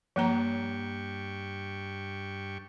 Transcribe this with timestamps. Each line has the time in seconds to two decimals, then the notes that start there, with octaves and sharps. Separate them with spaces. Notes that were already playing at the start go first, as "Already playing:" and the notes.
0.16 G2 F3 A#3 G5 A#5 C#6